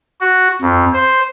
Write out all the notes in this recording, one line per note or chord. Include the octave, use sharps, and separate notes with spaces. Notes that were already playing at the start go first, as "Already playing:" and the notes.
F#4
F2
C5